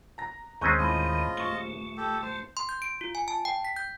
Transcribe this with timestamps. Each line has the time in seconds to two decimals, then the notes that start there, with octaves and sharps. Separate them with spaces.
0.18 A#5 A#6
0.61 D#2 D#3 G#3 C4 C#4 A#5 C#6 G6
0.79 A2 F4 D#5
1.37 D#1 A3 C#6 G7
1.97 G4 A4
2.23 C5 A5
2.57 C6
2.69 G6
2.82 D7
3.01 F4
3.15 G#5
3.28 A5
3.45 G5
3.65 B6
3.76 G6